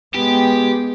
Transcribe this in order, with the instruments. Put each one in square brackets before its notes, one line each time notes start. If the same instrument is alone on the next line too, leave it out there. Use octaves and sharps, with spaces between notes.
[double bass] G#3 B3 [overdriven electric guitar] G4